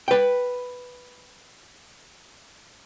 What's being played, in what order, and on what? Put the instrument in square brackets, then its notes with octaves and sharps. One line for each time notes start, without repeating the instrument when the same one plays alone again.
[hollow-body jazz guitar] B4 G5